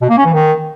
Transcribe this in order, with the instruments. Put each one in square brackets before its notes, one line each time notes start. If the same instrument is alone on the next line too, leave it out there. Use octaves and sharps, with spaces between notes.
[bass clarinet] B2
A#3
C#4
E3
D#3